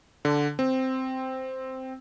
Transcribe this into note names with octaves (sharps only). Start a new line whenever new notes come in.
D3
C4